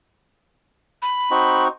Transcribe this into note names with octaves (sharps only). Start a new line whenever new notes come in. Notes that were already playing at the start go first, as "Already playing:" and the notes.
B5
C4 D#4 F#4